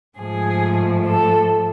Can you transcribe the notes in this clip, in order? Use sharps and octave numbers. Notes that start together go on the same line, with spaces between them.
G#2 F3 A3 G#4
A4